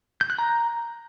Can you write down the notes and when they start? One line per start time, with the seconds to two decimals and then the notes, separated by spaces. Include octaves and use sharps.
0.21 G6
0.30 F#6
0.39 A#5